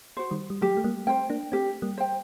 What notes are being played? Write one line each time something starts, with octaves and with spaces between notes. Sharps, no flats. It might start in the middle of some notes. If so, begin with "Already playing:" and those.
F#4 C5
D#3 G3
G3
F#3 A3 G4
A3
G3 A#3
A3 C4 C5 G5
A#3 D4
A3 C4 G4
G3 A#3
C5 G5